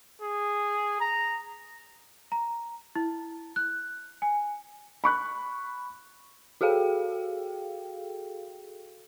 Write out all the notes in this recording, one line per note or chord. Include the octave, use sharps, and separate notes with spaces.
G#4
A#5
A#5
E4
F#6
G#5
B5 C#6 F#6
F#4 G#4 A4 F5 G5